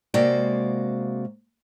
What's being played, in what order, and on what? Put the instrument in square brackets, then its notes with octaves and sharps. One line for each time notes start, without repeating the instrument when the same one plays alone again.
[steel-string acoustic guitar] C3 G#3 A#3 F#4 D5